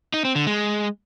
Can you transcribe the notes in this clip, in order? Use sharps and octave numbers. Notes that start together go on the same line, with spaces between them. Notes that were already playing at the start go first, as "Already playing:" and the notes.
D#4
C4
D3
G#3